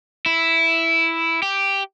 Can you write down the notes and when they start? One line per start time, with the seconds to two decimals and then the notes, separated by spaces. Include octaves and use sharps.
0.26 E4
1.42 G4